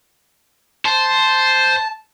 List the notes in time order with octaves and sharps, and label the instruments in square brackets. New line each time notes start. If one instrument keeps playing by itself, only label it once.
[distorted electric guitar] C5 [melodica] A5